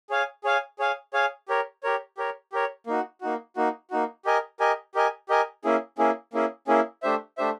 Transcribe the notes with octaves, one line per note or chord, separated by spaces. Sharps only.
G#4 C#5 F5 G#5
G#4 C#5 F5 G#5
G#4 C#5 F5 G#5
G#4 C#5 F5 G#5
G4 A#4 C#5
G4 A#4 C#5
G4 A#4 C#5
G4 A#4 C#5
A#3 D#4 F#4
A#3 D#4 F#4
A#3 D#4 F#4
A#3 D#4 F#4
G4 A#4 D#5 G#5
G4 A#4 D#5 G#5
G4 A#4 D#5 G#5
G4 A#4 D#5 G#5
A#3 C#4 E4 G#4
A#3 C#4 E4 G#4
A#3 C#4 E4 G#4
A#3 C#4 E4 G#4
A3 D4 G4 C5 E5
A3 D4 G4 C5 E5